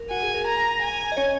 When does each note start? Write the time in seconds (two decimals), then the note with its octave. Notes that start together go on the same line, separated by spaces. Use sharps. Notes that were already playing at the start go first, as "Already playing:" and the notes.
Already playing: A#4
0.11 F#4 F#5 G#5
0.23 G#4
0.34 A#4
0.47 A#5
0.82 G#5
1.12 D#5
1.17 C#4 C#5